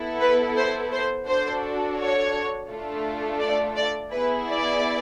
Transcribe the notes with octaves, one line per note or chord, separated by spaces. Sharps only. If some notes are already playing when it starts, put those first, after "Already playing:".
Already playing: B3 E4 A4
B4
C5
C5
D4 F#4 A4 C5
C#5
A3 D4 F4 A4
D5
D5
B3 E4 G#4 B4
D5